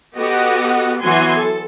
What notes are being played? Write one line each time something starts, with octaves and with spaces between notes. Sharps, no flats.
B3 F#4 G4 A4 D#5 F#5
E3 F#3 B3 F#4 G#5 C6
A4